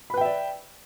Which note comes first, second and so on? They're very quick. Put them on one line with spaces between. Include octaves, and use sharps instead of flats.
B5 B4 G5 E5 D5